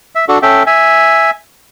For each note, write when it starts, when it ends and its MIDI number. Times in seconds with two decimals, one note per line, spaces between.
0.15 0.25 76
0.28 0.39 62
0.28 0.39 66
0.28 0.39 69
0.43 0.63 61
0.43 0.63 69
0.43 0.63 76
0.43 0.63 79
0.67 1.31 76
0.67 1.31 80